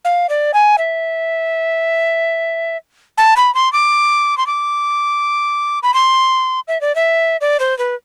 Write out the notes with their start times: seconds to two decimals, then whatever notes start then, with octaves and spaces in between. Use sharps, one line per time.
0.05 F5
0.29 D5
0.54 G#5
0.78 E5
3.18 A5
3.36 B5
3.55 C6
3.73 D6
4.37 C6
4.47 D6
5.83 B5
5.94 C6
6.68 E5
6.81 D5
6.95 E5
7.41 D5
7.60 C5
7.78 B4